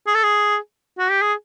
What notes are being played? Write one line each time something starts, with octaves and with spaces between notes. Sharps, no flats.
G#4
A4
G#4
F#4
G4
G#4